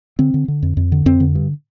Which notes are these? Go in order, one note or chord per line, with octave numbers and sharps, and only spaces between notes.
D3 C4
D3
D3
F2
F2
D3
F2 C4
D3
G2